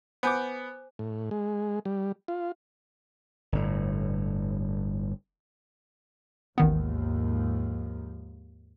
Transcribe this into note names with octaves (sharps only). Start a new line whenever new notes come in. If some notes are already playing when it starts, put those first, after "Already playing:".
B3 C5 G#5 D6 G6
A2
G#3
G3
F4
G1 A2
A1 D#2 G#2 D#3 F3 B3